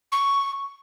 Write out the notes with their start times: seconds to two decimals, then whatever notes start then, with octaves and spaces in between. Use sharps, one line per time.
0.12 C#6